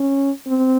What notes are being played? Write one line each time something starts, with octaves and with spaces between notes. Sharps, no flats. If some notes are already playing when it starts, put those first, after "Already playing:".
Already playing: C#4
C4